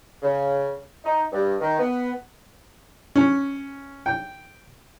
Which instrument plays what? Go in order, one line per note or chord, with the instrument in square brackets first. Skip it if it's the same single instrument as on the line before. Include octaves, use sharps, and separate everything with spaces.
[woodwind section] C#3
D#4
G2
D#3
B3
[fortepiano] C#4
G5